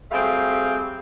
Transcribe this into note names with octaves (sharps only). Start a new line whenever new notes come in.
F#3 G3 A3 C4 G#4 F5